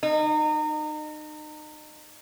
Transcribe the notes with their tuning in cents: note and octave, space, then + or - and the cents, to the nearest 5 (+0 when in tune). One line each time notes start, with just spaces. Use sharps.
D#4 -30